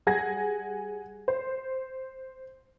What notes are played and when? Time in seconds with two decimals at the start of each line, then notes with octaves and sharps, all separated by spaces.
0.06 G3 G#4 F#5 G#5 G#6 A#6
1.28 C5